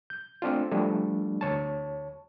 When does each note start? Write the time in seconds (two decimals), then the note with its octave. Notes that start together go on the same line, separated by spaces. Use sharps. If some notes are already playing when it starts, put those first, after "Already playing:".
0.10 G6
0.42 A3 C4 D4 F4
0.72 F3 G3 A3 D4
1.41 D2 C#5 A5